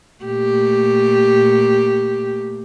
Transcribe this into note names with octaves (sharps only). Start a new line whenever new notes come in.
A#2 A3 G4